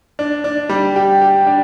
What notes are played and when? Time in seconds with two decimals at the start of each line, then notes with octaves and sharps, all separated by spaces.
0.19 D4
0.44 D4
0.69 G3
0.96 G4
1.21 G4
1.47 D4